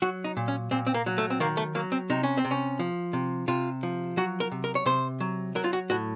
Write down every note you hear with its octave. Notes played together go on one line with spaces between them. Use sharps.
F#3 F#4
D#4
A#2
C#4
A#2 C4
C4
A#3
F#3
A3
C4
D#3 A#3
A3
F#3 A#3
C4
C3 D#4
C#4
C4
C3
C#4
F3
C3
C3 F4
F3
F#3 F#4
A#4
C3
A#4
C#5
C3 C5
F#3
F#3 A#4
F4
F#4
A2 F#4